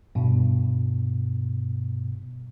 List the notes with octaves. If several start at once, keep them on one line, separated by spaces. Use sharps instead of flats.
G2 B2